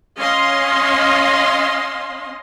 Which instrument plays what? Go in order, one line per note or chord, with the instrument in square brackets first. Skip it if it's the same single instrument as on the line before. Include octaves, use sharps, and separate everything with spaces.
[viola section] C#4 D#5 F5 C6